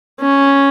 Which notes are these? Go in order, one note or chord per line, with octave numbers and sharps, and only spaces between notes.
C#4